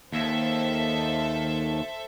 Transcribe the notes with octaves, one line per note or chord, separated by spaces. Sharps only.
D#2 A4 C5 E5